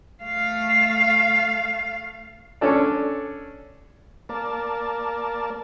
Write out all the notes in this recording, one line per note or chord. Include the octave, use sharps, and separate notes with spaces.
A3 F5
C#4 D4 A4 D5
A#3 A#4 D5 A5